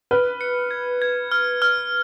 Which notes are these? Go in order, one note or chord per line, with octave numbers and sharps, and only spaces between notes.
B4 F6
C#7
G#6
G#6
F6
F6